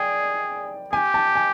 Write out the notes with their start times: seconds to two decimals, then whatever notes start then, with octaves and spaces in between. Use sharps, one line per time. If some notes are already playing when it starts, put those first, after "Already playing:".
Already playing: G#4 D5 G5
0.92 G4 G#5
1.14 A5
1.36 G#5